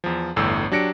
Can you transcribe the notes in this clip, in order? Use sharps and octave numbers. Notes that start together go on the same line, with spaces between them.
E2 F3
G1 E2 A2 E6
F#3 D4 G4 A#6 C#7 D7